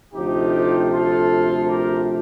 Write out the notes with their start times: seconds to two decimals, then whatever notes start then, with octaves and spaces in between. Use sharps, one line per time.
0.14 D2 C3 F3 A3 D#4 G4
0.90 F4 A4
1.67 G4 A#4